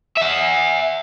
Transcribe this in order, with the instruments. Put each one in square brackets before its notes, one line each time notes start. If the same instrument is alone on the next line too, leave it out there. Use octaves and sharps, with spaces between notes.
[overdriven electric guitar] E5 F#5